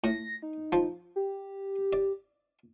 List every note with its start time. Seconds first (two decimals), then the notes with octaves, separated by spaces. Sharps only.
0.04 A2 A#6
0.43 D#4
0.72 F3
1.16 G4
1.93 D5